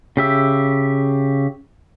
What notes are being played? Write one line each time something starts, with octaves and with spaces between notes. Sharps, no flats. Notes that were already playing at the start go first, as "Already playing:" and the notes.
C#3 G4 E5